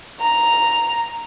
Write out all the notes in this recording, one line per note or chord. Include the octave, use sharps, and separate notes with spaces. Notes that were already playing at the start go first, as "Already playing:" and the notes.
A#5